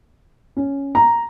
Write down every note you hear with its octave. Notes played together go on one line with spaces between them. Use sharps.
C#4
A#5